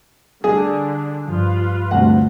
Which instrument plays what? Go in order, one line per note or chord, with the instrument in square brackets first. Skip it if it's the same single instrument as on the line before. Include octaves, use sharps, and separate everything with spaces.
[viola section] D3 D4 [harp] G3 [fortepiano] G#4
[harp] G2 F3 [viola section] F4 B4
[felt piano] D2 G2 C3 [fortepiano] F#5 [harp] A#6